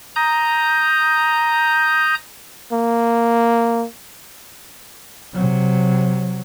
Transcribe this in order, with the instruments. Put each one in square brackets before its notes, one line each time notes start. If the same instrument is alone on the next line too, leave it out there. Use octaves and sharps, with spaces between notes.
[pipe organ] A#5 D#6 G6
[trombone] A#3
[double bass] C3 F#3